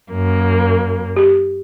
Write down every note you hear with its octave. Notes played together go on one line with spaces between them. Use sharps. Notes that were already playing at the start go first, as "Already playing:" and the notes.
F#2 A#3
G4